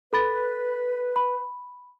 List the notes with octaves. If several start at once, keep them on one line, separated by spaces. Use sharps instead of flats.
A4 B4 B5 A6
B5